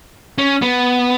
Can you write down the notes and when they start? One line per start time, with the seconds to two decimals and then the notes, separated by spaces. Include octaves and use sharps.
0.38 C#4
0.62 B3